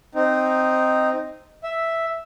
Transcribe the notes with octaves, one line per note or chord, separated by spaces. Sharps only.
C4 D#4
E5